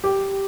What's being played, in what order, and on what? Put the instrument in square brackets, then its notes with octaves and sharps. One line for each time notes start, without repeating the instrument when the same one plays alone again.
[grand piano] G4